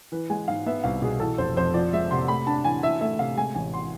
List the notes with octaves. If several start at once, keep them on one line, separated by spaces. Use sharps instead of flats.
E3 B4
G#3 G#5
G#2 F5
B3 E5
C2 F5
B2 G#4
E3 A4
F1 C5
F2 C5
F3 D5
G#3 E5
C3 C6
A3 B5
D4 A5
E3 G#5
E3 E5
A3 E5
C3 F5
G#3 G#5
A1 G#5
C6